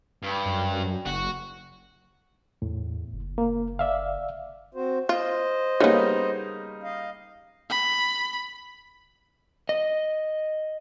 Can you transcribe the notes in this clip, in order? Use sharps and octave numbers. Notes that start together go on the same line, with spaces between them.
G2
F#2
F#1 F#4
E2 A2
F#1
A#3
D5 E5 F5
C4 F#4 C5
F4 C5 D#5
C#3 G3 A#3 B3 D#4
D#5 F5
B5
D#5